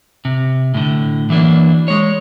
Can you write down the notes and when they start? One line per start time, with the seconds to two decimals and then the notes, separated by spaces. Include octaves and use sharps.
0.25 C3
0.74 A2 D3
1.30 E3 F#3 A#3 D4
1.88 G#3 C#5